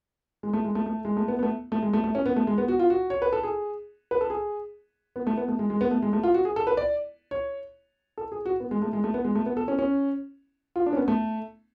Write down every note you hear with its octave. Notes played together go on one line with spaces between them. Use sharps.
G#3
A3
G#3
A3
A3
G#3
A3
B3
B3
A3
A3
G#3
A3
A3
C#4
B3
A3
G#3
B3
F#4
F4
F#4
C#5
B4
A4
G#4
B4
A4
G#4
B3
A3
B3
A3
G#3
G#3
B3
A3
G#3
A3
F4
F#4
G#4
A4
B4
D5
C#5
A4
G#4
F#4
B3
G#3
A3
G#3
A3
B3
G#3
A3
B3
A4
C#4
C#4
F4
D4
C#4
B3
A3